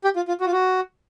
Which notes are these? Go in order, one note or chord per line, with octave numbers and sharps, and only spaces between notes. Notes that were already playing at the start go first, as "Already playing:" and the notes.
G4
F4
F4
F#4
F4
F#4